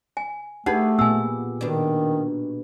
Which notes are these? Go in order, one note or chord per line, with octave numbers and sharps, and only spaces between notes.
G#5
A3 D4 D#4 G4 G#4 B4 F#5
A#2 B3 G#5 E6
B2 D#3 D4